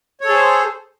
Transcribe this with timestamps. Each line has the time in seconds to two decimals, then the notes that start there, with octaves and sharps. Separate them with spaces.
0.21 C#5
0.25 A4
0.29 G#4
0.33 C5